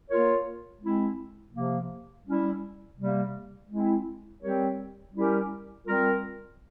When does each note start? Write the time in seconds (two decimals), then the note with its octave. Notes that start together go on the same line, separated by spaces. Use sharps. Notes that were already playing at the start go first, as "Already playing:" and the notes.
0.09 A#3 F4 A#4 C#5
0.81 G#3 C4 E4
1.53 C3 F3 A#3
2.26 G3 C#4 E4
2.97 C3 G3 A#3
3.70 G#3 C4 E4
4.42 G3 C4 G4 A#4 C#5
5.14 G3 C#4 E4 G4 A#4
5.86 G3 C4 F4 A#4